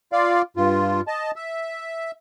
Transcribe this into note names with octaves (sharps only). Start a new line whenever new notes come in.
F4 D5 F5
G2 F4
D#5 A5
E5